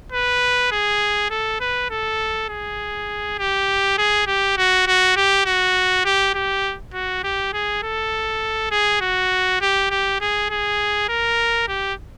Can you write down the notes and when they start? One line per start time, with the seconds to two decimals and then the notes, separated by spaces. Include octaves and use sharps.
0.12 B4
0.72 G#4
1.30 A4
1.60 B4
1.90 A4
2.49 G#4
3.39 G4
3.98 G#4
4.27 G4
4.57 F#4
4.87 F#4
5.16 G4
5.45 F#4
6.05 G4
6.35 G4
6.94 F#4
7.24 G4
7.53 G#4
7.83 A4
8.71 G#4
9.01 F#4
9.61 G4
9.90 G4
10.21 G#4
10.50 G#4
11.09 A#4
11.68 G4